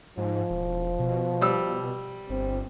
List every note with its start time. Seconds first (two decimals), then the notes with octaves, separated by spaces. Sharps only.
0.17 G#2 F3
0.51 E1
0.99 B2
1.41 G3 E6
2.30 G1 C4